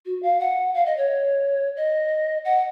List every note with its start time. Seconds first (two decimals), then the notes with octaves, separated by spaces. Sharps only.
0.06 F#4
0.23 F5
0.40 F#5
0.74 F5
0.86 D#5
0.97 C#5
1.77 D#5
2.45 F#5